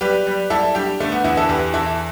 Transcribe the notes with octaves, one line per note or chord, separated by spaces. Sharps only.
G3 G4 B4
G3
G3 E4 A4
G3 D4 G4
D3 A3
B3
E2 B3 E4
E4 A4
E2 G4 B4
E2 E4 A4